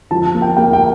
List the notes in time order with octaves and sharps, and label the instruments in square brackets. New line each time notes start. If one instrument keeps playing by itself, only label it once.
[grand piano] F3 A5
A#3
G5
A#3 G5
G5